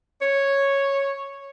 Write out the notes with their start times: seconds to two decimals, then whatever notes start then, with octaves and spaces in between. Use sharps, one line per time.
0.21 C#5